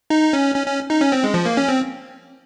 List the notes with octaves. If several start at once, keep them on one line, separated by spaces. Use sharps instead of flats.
D#4
C#4
C#4
C#4
D#4
C#4
C4
G#3
F3
A#3
C#4
C4